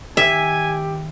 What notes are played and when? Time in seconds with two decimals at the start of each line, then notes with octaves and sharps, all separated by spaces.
0.17 D#3 G4 E5 G#5